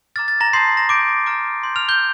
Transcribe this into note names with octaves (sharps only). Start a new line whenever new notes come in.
A#5 D6 F6 A6
A6
A#5 A#6
A5 C6 D#6 G6 C7
A#5 A#6
A#5 D6 G6 D7
A#5 D6 F6
C6 G6
F6 F7
G6 G7